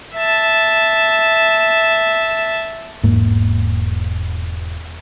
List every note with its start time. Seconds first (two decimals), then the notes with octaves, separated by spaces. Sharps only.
0.15 E5 A5
3.04 E1 G#2 A#3